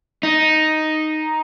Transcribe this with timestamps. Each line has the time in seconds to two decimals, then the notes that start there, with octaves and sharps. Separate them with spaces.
0.23 D#4